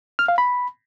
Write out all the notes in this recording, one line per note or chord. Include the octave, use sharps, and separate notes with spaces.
F6
F5
B5